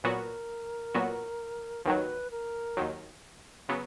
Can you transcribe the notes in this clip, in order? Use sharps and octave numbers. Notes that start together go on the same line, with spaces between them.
A#2 F#3 B3 F#4 A#4
A#2 F#3 B3 F#4
D#2 D#3 F#3 B4
A#4
D#2 D#3 F#3
C#3 F#3 B3